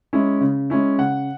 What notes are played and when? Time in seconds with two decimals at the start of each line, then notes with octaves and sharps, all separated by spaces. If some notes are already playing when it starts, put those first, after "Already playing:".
0.13 G#3 C#4 E4
0.41 C#3
0.70 G#3 C#4 E4
0.98 C#3 F#5